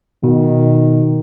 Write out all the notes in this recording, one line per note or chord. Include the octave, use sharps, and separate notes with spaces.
B2 D#3